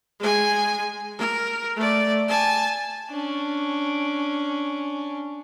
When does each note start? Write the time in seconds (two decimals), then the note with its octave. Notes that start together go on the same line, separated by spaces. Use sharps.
0.20 G#3 G#5
1.18 A#4
1.76 A3 D5
2.28 G#5 A5
3.10 C#4 D4